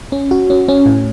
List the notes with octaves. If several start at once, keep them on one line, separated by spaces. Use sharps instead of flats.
C#4
F#4
C#4
C#4
A2